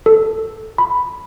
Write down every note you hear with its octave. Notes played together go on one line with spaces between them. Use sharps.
A4
B5